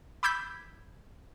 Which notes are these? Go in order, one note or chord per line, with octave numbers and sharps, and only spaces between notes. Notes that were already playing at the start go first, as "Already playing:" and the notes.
B5 D6 E6 G6 G#6 B6